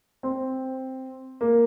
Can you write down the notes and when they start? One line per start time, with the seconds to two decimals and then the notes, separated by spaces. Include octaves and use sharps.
0.23 C4
1.41 A#3